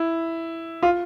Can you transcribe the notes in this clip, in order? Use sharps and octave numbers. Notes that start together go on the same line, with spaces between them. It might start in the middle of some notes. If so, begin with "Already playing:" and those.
Already playing: E4
F4